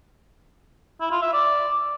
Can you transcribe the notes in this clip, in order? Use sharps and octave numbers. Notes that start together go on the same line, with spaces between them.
E4
F4
E5
D5